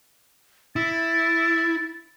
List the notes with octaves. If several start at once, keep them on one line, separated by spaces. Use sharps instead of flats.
E4 A6